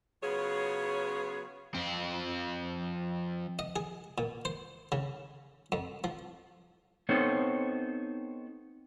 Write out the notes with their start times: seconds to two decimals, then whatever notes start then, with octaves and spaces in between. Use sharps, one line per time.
0.23 C#3 F#3 B3 F4 G#4 C#5
1.75 F2 C4
3.59 D#5
3.76 G#4
4.18 A#2
4.45 C5
4.92 C#3
5.72 F2
6.04 F3
7.09 B3 C4 D#4 A4 C5 C#5